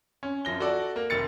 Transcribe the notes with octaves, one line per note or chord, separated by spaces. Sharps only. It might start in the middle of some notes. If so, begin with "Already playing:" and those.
C#4
F#2 F3 A#6 G7
F#4 A4 D5
A#3
F1 D#3 A6 C#7